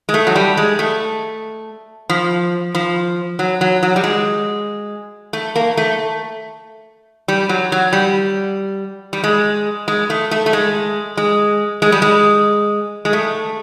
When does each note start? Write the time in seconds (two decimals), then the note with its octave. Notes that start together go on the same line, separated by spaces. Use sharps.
0.09 G#3
0.14 A3
0.27 F#3
0.35 G3
0.57 G#3
0.79 A3
2.10 F3
2.75 F3
3.39 F#3
3.61 F#3
3.83 F#3
3.96 G3
4.04 G#3
5.33 A3
5.56 A#3
5.77 A3
7.28 G3
7.49 F#3
7.72 F#3
7.93 G3
9.13 G3
9.24 G#3
9.88 G#3
10.10 A3
10.31 A3
10.46 A3
10.53 G#3
11.17 G#3
11.82 G#3
11.92 G3
12.02 G#3
13.05 G#3
13.13 A3